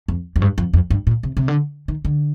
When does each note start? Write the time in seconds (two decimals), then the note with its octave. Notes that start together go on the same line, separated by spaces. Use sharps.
0.08 F2
0.36 F2
0.42 G2
0.58 F2
0.73 F2
0.90 G2
1.07 A#2
1.23 C3
1.37 C3
1.48 D3
1.88 D#3
2.05 D3